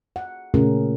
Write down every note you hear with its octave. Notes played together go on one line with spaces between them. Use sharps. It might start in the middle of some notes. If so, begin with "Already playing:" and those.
F#5
A#2 C#3 A3 C#4 G#4 A#4